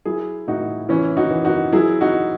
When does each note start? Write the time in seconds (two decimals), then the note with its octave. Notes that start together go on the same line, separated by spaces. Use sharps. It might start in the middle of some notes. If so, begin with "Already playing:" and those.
0.05 F#3 E4 G#4
0.47 A2 D#4 F#4
0.89 E3 C#4 E4
1.17 D#4 F#4
1.31 E3
1.45 D#4 F#4
1.72 F#3 E4 G#4
2.01 D#4 F#4